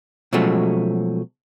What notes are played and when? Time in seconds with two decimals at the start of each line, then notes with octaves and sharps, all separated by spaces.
0.33 B2 F3 F#3 G#3 A3 C#4